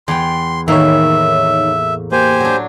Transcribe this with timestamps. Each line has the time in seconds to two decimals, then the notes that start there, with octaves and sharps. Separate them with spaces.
0.08 E2 G5 C6
0.68 A2 D#3 E3 A#3 D#4 C#5 E5
2.12 A#3 G4 C5 G#5
2.40 F#3 D4